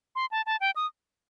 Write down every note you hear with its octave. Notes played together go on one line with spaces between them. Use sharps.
C6
A5
A5
G5
D#6